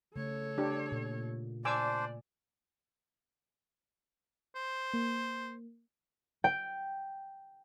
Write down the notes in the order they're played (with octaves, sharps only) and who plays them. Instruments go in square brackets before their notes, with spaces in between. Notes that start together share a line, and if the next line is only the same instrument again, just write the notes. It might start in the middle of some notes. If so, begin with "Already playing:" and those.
[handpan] C#3 A3 [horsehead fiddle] A4 C#5
[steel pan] D4 G4
[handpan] A#2
[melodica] D4 C5 [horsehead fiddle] D5 [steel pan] G#5 D6 E6
[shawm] C5
[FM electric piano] A#3
[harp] G5